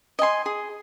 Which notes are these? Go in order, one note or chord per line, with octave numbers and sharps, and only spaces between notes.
D#5 G#5 C6
G#4